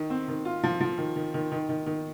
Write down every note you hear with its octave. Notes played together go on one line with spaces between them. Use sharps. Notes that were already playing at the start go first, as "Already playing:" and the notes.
Already playing: D#3
C4
D#3
F4
F3
F3
D#3
D#3
D#3
D#3
D#3
D#3